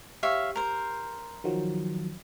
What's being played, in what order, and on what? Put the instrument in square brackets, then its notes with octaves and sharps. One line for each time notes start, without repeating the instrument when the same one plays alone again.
[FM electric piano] G4 [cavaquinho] C#5 E5 F5
[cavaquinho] A#4 C5
[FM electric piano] D#3 F3 F#3